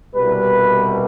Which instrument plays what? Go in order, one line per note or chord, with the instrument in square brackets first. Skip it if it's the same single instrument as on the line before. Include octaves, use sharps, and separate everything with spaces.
[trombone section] C2 B2 G3 B4